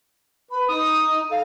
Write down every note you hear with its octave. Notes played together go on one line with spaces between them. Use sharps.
B4 B5
D#4 D#6
A4 F5